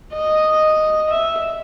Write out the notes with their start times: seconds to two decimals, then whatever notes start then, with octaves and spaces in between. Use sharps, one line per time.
0.13 D#5
1.09 E5